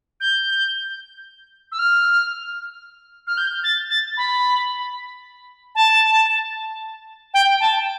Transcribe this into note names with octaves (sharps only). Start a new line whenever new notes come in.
G6
E6
F6
F6
G6
A6
A6
B5
A5
G5
A5